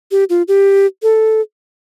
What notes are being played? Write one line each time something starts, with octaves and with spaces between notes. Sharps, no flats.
G4
F4
G4
A4